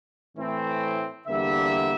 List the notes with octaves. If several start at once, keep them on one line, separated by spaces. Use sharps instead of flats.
A2 E3 A3 C4 E4
E2 D3 G3 A#3 E5